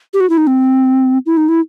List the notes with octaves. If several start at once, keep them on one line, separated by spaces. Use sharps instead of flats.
G4
F#4
E4
D#4
C4
E4
D#4
E4